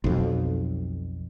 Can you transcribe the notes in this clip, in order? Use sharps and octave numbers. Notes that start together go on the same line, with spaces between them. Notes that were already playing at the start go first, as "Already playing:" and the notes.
B1 F2